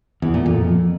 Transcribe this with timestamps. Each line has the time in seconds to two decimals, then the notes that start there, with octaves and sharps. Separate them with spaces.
0.22 E2
0.34 A#2
0.46 F2